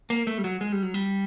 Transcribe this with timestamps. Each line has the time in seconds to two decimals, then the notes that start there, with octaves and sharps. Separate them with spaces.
0.10 A#3
0.27 A3
0.38 G3
0.44 F#3
0.61 G#3
0.72 G3
0.83 F#3
0.94 G3